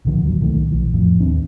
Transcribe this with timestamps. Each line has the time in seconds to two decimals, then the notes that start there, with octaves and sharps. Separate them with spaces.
0.05 C2 A#2 D3 F3
0.21 D1 D#2 F3 F#3
0.40 C2 A#2 D#3 A3
0.72 A#1 E3
0.93 F2 A2 F3
1.20 D#2 C4 D4